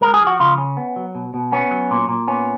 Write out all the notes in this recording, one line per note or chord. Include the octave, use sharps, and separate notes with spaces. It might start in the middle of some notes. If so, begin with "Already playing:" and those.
G#3 A#4
G#4
F3
F#4
C#3 F4
C#4
B3
F#3
B2
B2
B3 C#4
F#3
A#2
A#2
B3 C#4